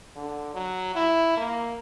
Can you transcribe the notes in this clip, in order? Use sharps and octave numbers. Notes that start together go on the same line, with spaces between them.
D3
F#3
E4
A#3